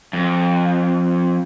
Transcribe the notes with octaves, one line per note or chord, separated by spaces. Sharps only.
F2